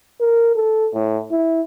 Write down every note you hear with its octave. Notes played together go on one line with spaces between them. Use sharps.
A#4
A4
A2
E4